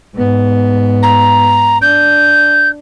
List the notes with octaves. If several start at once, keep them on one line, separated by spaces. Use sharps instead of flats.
G#2 B3
A#5
D4 G6